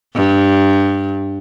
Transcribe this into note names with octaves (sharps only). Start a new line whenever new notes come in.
G2